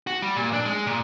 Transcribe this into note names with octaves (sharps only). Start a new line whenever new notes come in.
F#4
G3
A#2
D4
G#3
A#2